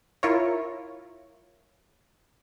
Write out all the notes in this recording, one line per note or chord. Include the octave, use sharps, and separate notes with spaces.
E4 F4 A#4 C#5